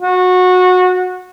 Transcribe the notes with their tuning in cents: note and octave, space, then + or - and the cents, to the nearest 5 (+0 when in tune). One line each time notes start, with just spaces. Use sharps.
F#4 -20